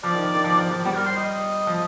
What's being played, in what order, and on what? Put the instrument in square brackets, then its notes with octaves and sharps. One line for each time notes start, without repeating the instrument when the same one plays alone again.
[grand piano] F3 [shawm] D5
[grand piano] D#3
F3
D#3
F3
F3
F3
[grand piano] G3 [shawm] D5
[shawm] A#4
C5
D#5
[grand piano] F3